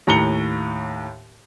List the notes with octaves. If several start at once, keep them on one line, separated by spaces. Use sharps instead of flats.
D#2 A2 A#5 C#7 G7